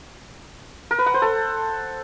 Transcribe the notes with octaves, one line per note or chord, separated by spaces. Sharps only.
A#4
B4
F#5
C5
A4